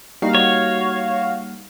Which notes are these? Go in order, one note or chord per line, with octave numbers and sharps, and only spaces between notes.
G3 A#3 D#4 F#4 F5
C#5